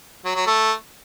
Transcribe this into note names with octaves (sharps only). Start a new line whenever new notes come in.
F#3
F#3
A3